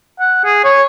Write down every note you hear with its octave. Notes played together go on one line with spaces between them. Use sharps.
F#5
G#4
C#5